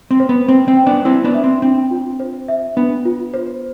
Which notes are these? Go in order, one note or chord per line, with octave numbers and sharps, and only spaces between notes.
C4
C5
B3
C4 C5
C4
G5
B3 D4
C4 E4 C5
B3 D4
E5
C4
C4 D4
F4
C5
E5
B3 D4
F4
C5